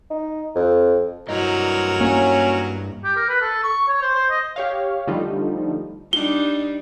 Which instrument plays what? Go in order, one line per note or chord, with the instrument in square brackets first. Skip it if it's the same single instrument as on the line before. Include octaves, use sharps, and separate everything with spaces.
[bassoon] D#4
F2
[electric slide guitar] G2 E4 D#5 [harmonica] F#3 A#4
[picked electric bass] A#3 [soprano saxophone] C#4
[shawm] G4
A#4
B4
A4
C#6
C#5
C5
C5
D#5
[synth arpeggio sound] G4 C#5 F5
D3 F3 G3 A3 D#4
[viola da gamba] G3 D4 D#4 [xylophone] G7